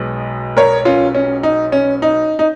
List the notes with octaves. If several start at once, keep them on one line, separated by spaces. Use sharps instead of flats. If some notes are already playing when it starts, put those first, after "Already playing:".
Already playing: B1 B2 G#3 B3
A#4 C#5
C#4 F4
C#4
D#4
C#4
D#4
D#4